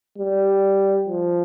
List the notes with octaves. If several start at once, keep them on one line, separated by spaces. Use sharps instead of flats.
G3
F3